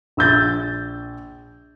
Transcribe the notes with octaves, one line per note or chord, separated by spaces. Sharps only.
A#1 E6 G6 A6